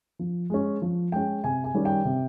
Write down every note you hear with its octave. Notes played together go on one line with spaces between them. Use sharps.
F3
G#3 C#4
F3
G#3 C#4 G5
C3 G#5
G#5
D#3 G3 C#4
G5
C3